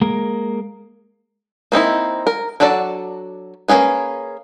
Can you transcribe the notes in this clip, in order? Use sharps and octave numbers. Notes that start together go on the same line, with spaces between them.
G#3 A#3 A#4
A#3 C4 D#4 E4
A#4
F#3 D4 F#4 A4 D5
A#3 C4 C#4 G#4 B4